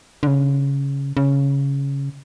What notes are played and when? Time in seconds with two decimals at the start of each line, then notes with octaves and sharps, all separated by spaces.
0.23 D3
0.27 C#3
1.17 C#3